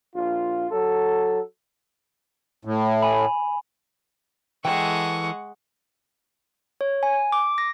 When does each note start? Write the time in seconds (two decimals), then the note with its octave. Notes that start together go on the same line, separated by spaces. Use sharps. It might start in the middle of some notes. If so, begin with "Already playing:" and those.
0.15 A#1 F4
0.71 F#3 A4
2.65 A2
3.03 G#5 B5
4.65 E3 G#3 A4 F#5 G5 C#6
6.81 C#5
7.03 G#5
7.32 D6
7.58 A#6